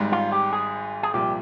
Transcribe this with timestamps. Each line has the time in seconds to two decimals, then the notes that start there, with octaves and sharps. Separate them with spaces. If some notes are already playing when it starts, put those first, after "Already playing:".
Already playing: G#1 G#2 G3
0.12 F4
0.32 G4
0.53 G#4
1.03 G#4
1.14 C2 A#2 F3 G4